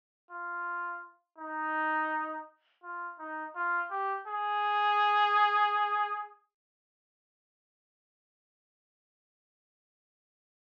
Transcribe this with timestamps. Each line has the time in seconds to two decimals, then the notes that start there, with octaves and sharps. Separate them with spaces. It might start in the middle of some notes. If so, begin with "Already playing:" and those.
0.30 F4
1.38 D#4
2.83 F4
3.19 D#4
3.55 F4
3.91 G4
4.27 G#4